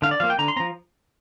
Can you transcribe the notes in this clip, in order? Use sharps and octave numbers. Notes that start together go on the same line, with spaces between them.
D3 F5
D5
F3 A#3 F5
G5
D3 A#5
C6
F3 C4 A#5